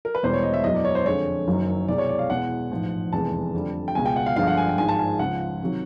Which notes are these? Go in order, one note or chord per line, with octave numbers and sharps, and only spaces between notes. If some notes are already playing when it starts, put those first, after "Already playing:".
A#4
B4
E1 E2 B2 G3 C5
C#5
D#5
E5
F#1 E2 B2 F#3 D#5
D5
C#5
C5
F2 D3 F3 G#3 C#5
F#1 F#2 D#3 F#3
C2 B2 G#3 D5
C#5
D5
F5
E2 B2 G#3 F#5
A1 G#2 F3
F1 E2 C3 E3 G#3 A5
F2 D3 G3
G5
C#2 B2 G#3 G#5
G5
F#5
F5
G1 G2 D3 F3 G#3 F5
F#5
G#5
G5
G#1 G#2 F3 G#3 G#5
A5
G#5
C#2 C#3 F3 F#5
C3 D#3 F#3